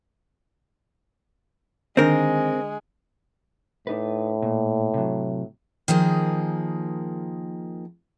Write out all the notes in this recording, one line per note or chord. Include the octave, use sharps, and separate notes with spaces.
D3 D#3 G#3 C4 D4 A#4 G6
A2 D4 D#4 B4
A#2
C3 F#3
D#3 F3 A#3 G#4